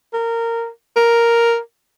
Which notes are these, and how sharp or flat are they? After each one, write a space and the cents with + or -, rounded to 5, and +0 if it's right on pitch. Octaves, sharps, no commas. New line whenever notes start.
A#4 -15
A#4 +0